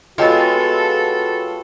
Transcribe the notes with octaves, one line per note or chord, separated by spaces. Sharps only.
G#3 B3 F4 F#4 A4 C#5 G5